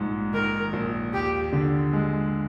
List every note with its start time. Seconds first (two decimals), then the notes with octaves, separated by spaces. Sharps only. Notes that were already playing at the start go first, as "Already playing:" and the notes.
Already playing: A#1 G#2
0.33 D#3 A#4
0.73 A#1
1.13 D#2 G4
1.53 D3
1.93 G#3